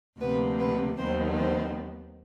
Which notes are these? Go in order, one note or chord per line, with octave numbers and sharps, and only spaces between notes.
D2 C3 F3 A#3 B3 B4
B3 B4
D#2 D#3 F#3 B3 C4 C5
C4 C5